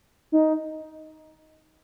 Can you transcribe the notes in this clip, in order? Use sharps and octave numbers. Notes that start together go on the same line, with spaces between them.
D#4